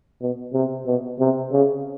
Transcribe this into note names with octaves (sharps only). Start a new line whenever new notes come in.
B2
C3
B2
C3
C#3